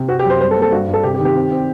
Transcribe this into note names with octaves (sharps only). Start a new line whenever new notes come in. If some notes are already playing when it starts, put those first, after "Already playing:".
Already playing: C3
C4 F#4
G4
F#2
C5
G3 C5
A4
A#3
A4
G2 F#4
G2
A4
C3 G4
G4
D#3
G4
C4
C4